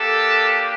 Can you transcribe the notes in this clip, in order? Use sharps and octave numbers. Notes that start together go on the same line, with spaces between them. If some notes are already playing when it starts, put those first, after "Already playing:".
Already playing: A#3 D4 G4 A4